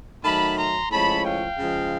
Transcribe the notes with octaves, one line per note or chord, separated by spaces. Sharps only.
D#3 F#3 A3 A5 B5
A#5 C6
A2 F3 G#3 C#4 A5 B5
F5 G5
C#3 F3 G#3